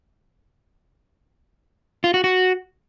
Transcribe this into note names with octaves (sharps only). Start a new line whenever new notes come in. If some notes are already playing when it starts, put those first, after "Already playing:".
F4
F#4
F#4